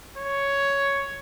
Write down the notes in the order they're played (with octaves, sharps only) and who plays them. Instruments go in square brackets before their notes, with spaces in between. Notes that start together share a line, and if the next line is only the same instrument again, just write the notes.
[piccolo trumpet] C#5